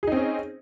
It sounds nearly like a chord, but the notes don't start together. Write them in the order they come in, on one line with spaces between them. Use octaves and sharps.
G#4 D#4 C4 C#4